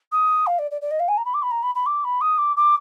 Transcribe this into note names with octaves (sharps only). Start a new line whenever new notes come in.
D#6
F5
D5
D5
D5
D#5
F5
G#5
A#5
B5
D6
B5
A#5
B5
B5
D6
B5
D#6
D6
D6